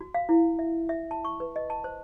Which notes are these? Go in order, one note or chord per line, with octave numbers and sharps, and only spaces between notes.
F#4
F5
E4
E5
E5
A5
C#6
B4
D#5
A5
C5